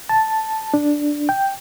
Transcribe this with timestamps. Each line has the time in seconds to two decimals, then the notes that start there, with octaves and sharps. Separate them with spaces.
0.09 A5
0.74 D4
1.29 G5